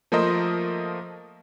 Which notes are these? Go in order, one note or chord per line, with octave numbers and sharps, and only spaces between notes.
F3 A3 A#3 A#4 C5 D#5